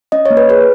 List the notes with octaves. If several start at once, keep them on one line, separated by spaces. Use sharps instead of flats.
C#4 D#5
C#5
A#3
B4
G#4 B4